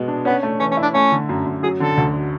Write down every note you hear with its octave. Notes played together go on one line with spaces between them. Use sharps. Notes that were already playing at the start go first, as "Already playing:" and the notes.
Already playing: B2 G#3 B3
D4
B3 C#4
A3
E3 C#4
C#4
E4
D4
A3 C#4
D3
F#2
F#2
F#3 G#4
D3 A4
D2